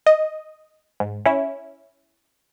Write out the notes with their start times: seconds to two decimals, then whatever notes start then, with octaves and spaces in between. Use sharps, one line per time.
0.06 D#5
1.00 G#2
1.26 C#4 E4